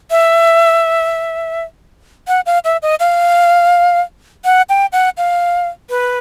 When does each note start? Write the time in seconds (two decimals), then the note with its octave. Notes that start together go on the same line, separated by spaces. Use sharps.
0.11 E5
2.28 F#5
2.46 F5
2.64 E5
2.82 D#5
3.00 F5
4.45 F#5
4.69 G5
4.93 F#5
5.17 F5
5.90 B4